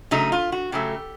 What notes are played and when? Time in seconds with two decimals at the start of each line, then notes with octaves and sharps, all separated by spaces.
0.11 C#3 F#3 A3 D#4
0.32 F4
0.52 F#4
0.72 C#3 F#3 A3 G4